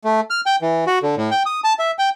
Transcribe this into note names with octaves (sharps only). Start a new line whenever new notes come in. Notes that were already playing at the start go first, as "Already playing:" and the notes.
A3
F6
G5
E3
F#4
D3
A2
G5
D#6
A5
E5
G5